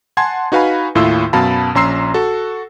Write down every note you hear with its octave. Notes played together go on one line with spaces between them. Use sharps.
F#5 G#5 A5 C6 G#6
D#4 F#4 B4 F5 G#5 B5
D#2 A2 E4 F4 C6 E6
F#2 B2 F5 A5 B5
A#1 C#4 A#5 C6 E6 C7
F#4 A4